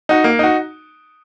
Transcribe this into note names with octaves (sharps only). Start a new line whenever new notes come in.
D#4 F#4
A#3
D#4 F#4